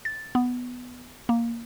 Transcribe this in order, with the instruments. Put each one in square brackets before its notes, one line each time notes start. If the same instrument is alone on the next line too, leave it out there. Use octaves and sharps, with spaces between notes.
[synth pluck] A6
B3
A#3